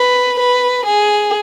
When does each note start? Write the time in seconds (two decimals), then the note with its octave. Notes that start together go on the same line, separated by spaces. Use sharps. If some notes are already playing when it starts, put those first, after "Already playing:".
Already playing: B4
0.39 B4
0.86 G#4